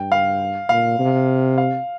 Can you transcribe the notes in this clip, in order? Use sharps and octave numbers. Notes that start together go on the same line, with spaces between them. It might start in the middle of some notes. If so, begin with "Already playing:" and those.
Already playing: G2 G5
F5
A#2 F5
C3
F5